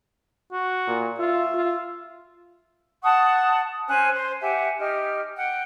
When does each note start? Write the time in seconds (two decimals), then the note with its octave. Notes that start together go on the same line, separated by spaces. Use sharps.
0.52 F#4
0.87 A#2
1.19 F4 E5
1.54 F4
3.03 F#5 A5 C#6 D#6
3.88 C#4 C5 G#5 F#6
4.14 C5
4.41 G4 E5 F#5 G#5
4.78 D#4 G4 F6
5.35 F#5 G5